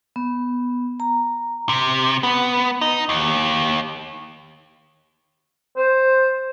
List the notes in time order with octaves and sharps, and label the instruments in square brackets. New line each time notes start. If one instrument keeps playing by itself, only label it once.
[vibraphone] B3
A#5
[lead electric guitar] C3
B3
D#4
D#2
[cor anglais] C5